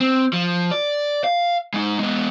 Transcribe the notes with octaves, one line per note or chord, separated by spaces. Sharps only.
C4
F3
D5
F5
G#3 D#4
G#3 B3